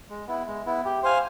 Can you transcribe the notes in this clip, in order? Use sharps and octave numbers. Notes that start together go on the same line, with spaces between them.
G#3
B3 E4
G#3
B3 E4
G4
C5 F5 G#5